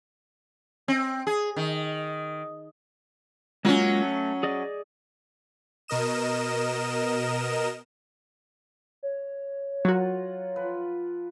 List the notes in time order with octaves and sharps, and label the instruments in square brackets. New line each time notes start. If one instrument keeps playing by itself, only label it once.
[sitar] C4
G#4
D#3
[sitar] F#3 C#4 [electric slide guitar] G#3 A#3 F4
[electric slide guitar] A3
G#4 D5 D#5
[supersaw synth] B2 A#4 D#5 E7
[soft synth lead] C#5
[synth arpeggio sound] F#3 F#4 [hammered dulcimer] F4 A#4 F#5
[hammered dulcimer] F3 B4